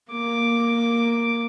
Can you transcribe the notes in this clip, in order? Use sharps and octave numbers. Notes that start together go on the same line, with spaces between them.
A#3 D6